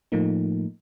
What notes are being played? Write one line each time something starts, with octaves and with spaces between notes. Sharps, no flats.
A2 F3 A3 A#3 D#4